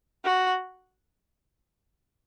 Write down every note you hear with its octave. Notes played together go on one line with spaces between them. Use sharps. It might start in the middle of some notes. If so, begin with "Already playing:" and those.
F#4